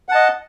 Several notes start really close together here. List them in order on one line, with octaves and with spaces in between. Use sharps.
F#5 A5 D#5